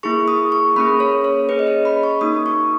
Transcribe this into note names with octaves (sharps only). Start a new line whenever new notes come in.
A#3 E4 G#4 C#6
D#6
C#6
A#3 C#4 G#4 B5
C#5
C#5
C#4 G#4 B4
D#5
C#5
B5
C#6
A#3 D#4 F#4 D#6
C#6